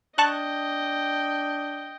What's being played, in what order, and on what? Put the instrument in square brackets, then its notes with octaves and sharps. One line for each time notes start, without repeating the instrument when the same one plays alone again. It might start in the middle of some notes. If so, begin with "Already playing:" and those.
[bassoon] D4 [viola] D#5 G5 [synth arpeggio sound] A5 C#6 F#6